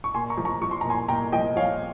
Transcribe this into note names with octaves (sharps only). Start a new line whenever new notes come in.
C#6
A#2 G#5 C6
A#5 C#6
F3
A#5 C#6
F3 C#6
C6
A#2 A#5
G#5 C6
A#2 G5 A#5
F3 D#5 G5
F3 C#5 F5